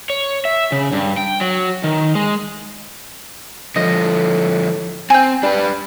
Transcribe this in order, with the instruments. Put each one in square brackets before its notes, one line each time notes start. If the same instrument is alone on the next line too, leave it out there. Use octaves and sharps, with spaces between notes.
[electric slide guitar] C#5
E5
C#3
G2
G5
F#3
D#3
G#3
[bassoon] A2 [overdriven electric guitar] D3 F3 [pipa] D#5
[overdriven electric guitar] C4 [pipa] G5 G#5
[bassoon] G3 [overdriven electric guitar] D4 B4